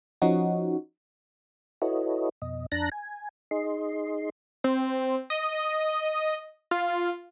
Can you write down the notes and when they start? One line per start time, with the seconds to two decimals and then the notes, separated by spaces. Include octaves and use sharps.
0.22 F3 C#4 D#4 F#4
1.82 E4 F#4 A4 B4 C#5 D#5
2.42 F2 B2 D#5
2.72 F2 D4 A5 A#5 F#6 A#6
2.92 G#5
3.51 D#4 G#4 D#5 C6
4.64 C4
5.30 D#5
6.71 F4